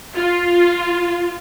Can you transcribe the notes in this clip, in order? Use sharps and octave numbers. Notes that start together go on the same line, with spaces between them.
F4